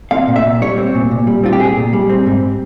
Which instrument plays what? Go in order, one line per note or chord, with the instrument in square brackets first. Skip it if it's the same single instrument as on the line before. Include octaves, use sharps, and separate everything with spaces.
[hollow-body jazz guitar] C4 F5
A#2
E5
A#2
G3 C#5
C4
A#2
A#2
G3
C4 F4
G4
A#2 G#4
A#2
G3
C4
G#2